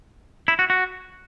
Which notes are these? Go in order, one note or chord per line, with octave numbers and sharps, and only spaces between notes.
E4
F#4
F#4